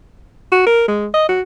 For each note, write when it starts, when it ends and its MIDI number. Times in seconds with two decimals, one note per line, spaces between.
0.52 0.64 66
0.67 0.86 70
0.88 1.07 56
1.14 1.28 75
1.29 1.41 66